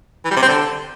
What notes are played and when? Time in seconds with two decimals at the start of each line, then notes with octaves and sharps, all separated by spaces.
0.25 E3
0.31 G3
0.37 C3
0.42 C4
0.48 D3